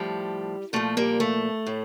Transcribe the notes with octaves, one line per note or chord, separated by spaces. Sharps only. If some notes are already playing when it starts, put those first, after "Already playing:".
Already playing: A2 F3 G3
A#2 F3 A3
G3 A#3
A3
A2